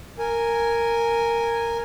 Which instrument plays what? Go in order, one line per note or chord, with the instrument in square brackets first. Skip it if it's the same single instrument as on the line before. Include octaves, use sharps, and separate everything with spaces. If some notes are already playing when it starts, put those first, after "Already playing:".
[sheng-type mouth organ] A#4 G#5